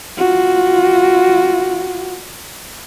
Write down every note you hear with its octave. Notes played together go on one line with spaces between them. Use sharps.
F4 F#4